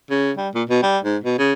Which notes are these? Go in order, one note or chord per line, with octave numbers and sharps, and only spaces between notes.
C#3
G3
A#2
B2
G3
G#2
B2
C#3